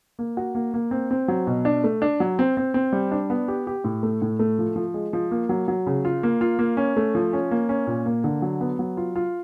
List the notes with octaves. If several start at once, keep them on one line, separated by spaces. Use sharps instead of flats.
A#3
F#4
A#3
A#3
C4
C4
F#3
B2
D4
A3
D4
F#3
C4
C4
C4
G3
D4
B3
G4
G4
A2
A3
A2
A3
F3
F3
G#3
F3
A#3
F#3
F#3
C#3
F4
A#3
F4
A#3
C#4
A3
F3
C#4
A#3
C#4
A#2
A#3
D3
F#3
B3
F#3
F4
F4